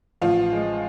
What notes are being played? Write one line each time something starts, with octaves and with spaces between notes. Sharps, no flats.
A1 F3 F4
G#3